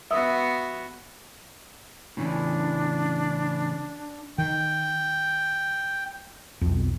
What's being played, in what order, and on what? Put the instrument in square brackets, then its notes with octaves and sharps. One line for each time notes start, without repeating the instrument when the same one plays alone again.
[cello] B3 F#4 [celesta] E5 D#6 E6
[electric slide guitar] A2 C#3 E3 [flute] D4
[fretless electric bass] D#3 [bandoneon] G5
[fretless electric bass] B1 F2